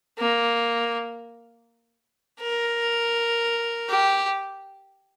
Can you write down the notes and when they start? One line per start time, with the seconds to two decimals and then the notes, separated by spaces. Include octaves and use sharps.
0.19 A#3
2.41 A#4
3.89 G4